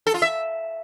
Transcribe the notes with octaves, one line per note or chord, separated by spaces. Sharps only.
A4
F4
E5